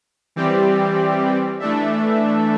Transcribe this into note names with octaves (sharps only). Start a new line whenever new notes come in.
E3 G3 C4 G4 D5
E3 A3 D4 A4 E5